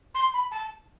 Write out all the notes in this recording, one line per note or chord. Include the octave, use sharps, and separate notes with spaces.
C6
B5
A5